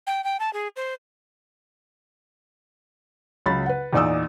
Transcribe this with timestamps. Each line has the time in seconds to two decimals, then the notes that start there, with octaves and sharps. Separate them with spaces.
0.07 G5
0.24 G5
0.40 A5
0.53 G#4
0.76 C5
3.46 C#2 F#3 B5 A6
3.66 B4 F#5
3.93 E2 A#2 D#4 D5 D#6 E6